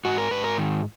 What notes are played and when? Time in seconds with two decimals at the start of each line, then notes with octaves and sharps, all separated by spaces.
0.05 G#2 F#4
0.18 A#4
0.31 G#2 B4
0.44 A#4
0.58 D#3